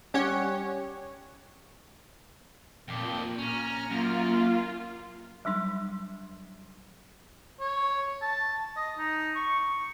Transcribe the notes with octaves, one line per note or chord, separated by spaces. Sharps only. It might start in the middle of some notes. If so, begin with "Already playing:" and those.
G3 C#4 G4 C#5 F#5
F2 A#2 G4
C#4 A#5 F6
F#2 A#3 F4
F#3 G3 D4 C6
C#5
A5
D#5
D#4
C#6